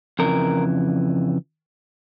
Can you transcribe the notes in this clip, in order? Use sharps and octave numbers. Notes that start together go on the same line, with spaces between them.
F2 C#3 E3 A#4